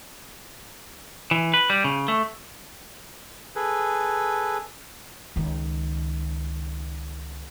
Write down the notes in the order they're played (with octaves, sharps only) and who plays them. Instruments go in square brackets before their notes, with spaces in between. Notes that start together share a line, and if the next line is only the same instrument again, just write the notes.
[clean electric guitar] E3
B4
G3
C#3
A3
[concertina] G#4 A4 B4
[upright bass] C#2 D#3